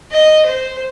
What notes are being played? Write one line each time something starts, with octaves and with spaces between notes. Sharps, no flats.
D#5
C5